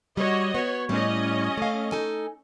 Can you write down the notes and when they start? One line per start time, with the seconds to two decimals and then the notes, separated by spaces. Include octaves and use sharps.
0.17 G3 F#4 C#5 D#5
0.55 B3 C#5
0.89 A2 G3 C#4 D#5
1.57 A3 F5
1.92 D#4 A4 G#5